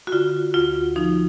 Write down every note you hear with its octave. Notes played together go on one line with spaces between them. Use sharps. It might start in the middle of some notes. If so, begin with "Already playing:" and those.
F#4
D3 F4
D2 F4
F3 D#4